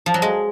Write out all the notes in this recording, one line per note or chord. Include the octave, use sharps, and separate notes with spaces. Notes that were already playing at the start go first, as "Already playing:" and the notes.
F3
F#3
G#3